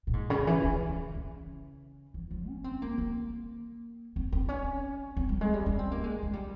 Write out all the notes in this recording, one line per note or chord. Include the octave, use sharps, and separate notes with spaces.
A#2
G#2
C#3
E3
E3
C#3
C#3
E3
F3
C#4
C4
A#3
A#3
C4
C4
C#4
C4
G3
G#3
G3
C#4
C4
A#3
G#3
G#3
G3